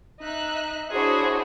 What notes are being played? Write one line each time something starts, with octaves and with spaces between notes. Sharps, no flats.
D#4 E5 F#6
D4 E4 F#4 G#4 C5 C#5